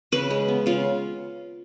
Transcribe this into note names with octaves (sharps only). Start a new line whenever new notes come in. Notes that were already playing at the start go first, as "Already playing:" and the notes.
C#3 B4
G#3
B3
C#3 F4